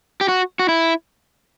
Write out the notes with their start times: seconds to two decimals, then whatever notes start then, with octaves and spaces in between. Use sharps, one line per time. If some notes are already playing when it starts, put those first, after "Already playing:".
0.21 G4
0.28 F#4
0.59 F#4
0.69 E4